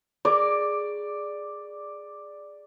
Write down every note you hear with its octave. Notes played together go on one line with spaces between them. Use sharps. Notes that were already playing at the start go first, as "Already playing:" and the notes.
G#4 A#4 D5 D6